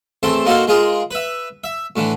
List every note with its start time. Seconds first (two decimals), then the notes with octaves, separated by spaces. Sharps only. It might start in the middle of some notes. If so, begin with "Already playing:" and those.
0.23 E2 A3 C4 A5 C6
0.45 A#3 D#4 F#4 A4 C5 F5
0.67 G#3 F4 G#4 A#4
1.11 B4 E5
1.64 E5
1.96 A2 D3 E3